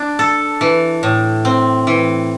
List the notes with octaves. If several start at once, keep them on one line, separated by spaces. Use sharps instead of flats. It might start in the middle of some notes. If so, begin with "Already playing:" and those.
Already playing: D4
A4
E3
A2
C4
E3